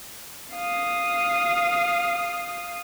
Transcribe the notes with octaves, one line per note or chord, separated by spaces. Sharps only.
F5 D#6